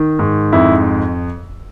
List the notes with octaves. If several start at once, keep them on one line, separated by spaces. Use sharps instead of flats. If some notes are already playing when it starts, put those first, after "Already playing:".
Already playing: D#3
G#2
F2 E4